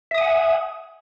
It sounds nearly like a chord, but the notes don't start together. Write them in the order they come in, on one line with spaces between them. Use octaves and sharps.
E5 D#6 G#5 F#5